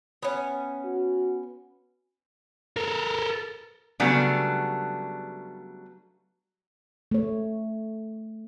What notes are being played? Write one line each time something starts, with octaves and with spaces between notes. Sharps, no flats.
B3 C#4
F#4
A4 A#4
C#3 F#3 G3 A3 B3 D4
A3 C#5